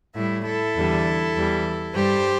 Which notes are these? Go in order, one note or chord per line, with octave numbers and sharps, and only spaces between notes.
A2 G3 E4
E4 A4
E2 D3 G3
E2 E3 G3
G2 G3 G4 C5